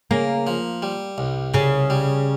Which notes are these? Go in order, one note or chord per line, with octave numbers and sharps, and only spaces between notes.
C#3 A#3
F3
G3
C2
C#3 C#4
G3